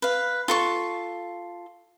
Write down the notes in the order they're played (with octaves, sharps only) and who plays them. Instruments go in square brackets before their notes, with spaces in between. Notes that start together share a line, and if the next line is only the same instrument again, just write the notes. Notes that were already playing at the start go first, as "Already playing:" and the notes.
[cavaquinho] B4 F5
F4 A4 C#6